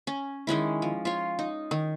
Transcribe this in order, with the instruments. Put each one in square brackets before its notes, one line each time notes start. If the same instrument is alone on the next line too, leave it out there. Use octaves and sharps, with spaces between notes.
[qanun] C#4
D#3 G#3 C#4 E4
F3
F4 C#5
D#4
D#3